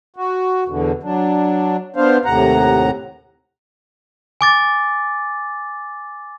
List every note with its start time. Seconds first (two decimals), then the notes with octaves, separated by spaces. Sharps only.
0.16 F#4
0.68 E2 B2 D3
1.03 F#3 D4
1.96 B3 D4 C5 F5
2.25 D#2 A2 C3 F#5 A#5
4.41 G#5 D6 A6